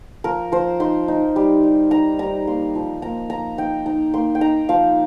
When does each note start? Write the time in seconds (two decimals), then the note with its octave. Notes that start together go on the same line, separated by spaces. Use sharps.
0.24 F3 A#4
0.52 F3 C5
0.80 D#4 C6
1.08 D#4
1.36 G3
1.63 G3
1.91 D#4 A#5
2.19 G3 A#5
2.47 A#3 C6
2.75 F3
3.02 A#3 A#5
3.30 F3 A#5
3.58 D#4 G5
3.86 D#4 A#5
4.14 A#3 C6
4.35 G5
4.41 D#4 A#5
4.69 F3 F5